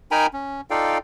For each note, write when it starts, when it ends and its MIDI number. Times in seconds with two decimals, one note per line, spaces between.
0.11 0.27 63
0.11 0.27 70
0.11 0.27 79
0.11 0.27 80
0.11 0.27 82
0.11 0.27 83
0.33 0.61 61
0.70 0.98 63
0.70 0.98 65
0.70 0.98 69
0.70 0.98 74
0.70 0.98 77
0.70 0.98 79